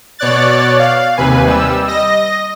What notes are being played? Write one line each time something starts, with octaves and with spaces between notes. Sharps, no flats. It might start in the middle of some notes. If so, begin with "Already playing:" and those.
B2 C#5 D5 F#6 A6
F5
D#2 C3 B4 G#5
G3 E6
D#5 A#6